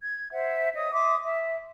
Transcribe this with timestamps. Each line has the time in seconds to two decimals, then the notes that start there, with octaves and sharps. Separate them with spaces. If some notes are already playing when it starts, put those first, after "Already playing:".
0.02 G#6
0.31 C5 E5 F#5
0.75 C#5 D#5 D#6
0.92 E5 C6 D6 D#6
1.23 E5